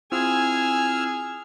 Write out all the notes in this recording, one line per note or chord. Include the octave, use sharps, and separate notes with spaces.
C4 E4 F4 G#4 G#5 E6 F6